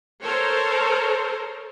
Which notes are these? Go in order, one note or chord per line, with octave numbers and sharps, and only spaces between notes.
A4 A#4 C5 C#5